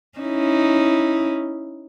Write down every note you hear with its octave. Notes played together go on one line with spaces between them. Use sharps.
C#4 D#4 E4